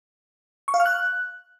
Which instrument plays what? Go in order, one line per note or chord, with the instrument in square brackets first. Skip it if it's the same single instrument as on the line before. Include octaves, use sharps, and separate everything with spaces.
[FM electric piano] C#6
F5
F6
F#6